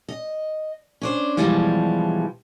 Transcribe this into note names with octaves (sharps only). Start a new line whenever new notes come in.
D#5
C#4 D4 C5
B2 D3 E3 F3 G3 G#3